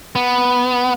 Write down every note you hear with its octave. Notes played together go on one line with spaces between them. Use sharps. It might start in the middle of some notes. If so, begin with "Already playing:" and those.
B3